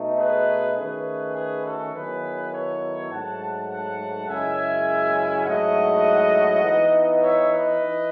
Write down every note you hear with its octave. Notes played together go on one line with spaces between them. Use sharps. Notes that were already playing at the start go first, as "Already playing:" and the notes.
Already playing: B2 A3 D#4
G#4 B4
D#3 A3 C#4 G#4 B4
G#4 B4
F#4 A4
D#3 F#3 B3 E4 G#4 B4
A4 C#5
G#2 F#3 A3 F#5 A5
F#5 A5
F#2 C#3 G#3 C#4 E4 E5 G#5
G#2 F#3 A3 E4 D#5 F#5
E3 B3 D#4
C#5 E5
B4 D#5
E3